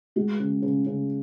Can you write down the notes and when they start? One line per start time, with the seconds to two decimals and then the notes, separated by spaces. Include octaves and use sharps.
0.16 G#3 F#4
0.40 C#3
0.62 C#3
0.86 C#3